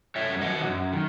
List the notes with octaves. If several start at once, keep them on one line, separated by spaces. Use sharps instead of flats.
F#2 C#5 E5
D#3 F#3 D#5 F#5
F#2
D#3